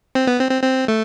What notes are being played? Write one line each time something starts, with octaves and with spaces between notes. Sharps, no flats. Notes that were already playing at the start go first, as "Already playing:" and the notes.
C4
B3
C4
C4
C4
A3